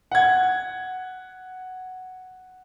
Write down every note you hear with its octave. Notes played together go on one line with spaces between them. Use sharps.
F#5 G#6